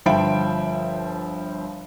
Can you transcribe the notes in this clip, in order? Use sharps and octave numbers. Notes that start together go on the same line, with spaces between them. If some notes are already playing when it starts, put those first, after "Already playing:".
G1 F3 E5 G5 B5 D7